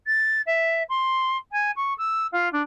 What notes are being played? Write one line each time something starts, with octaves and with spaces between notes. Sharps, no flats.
A6
E5
C6
G#5
C#6
E6
F4
D4